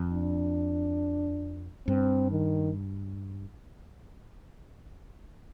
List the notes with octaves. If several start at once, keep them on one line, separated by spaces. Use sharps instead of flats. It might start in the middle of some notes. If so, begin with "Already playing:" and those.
Already playing: F2
D4
G2 C4
D#3